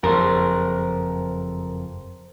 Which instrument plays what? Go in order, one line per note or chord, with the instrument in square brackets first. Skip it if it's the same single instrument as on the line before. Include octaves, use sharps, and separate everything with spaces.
[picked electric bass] F#1 F2 [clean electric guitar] A#4 C5